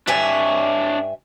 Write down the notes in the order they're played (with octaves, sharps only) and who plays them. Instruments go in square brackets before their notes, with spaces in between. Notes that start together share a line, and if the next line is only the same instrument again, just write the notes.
[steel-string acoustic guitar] G2 E5 G#5 [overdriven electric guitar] D4 C#5